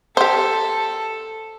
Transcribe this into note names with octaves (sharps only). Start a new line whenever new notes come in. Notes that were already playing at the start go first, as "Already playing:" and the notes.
G4 A4 C5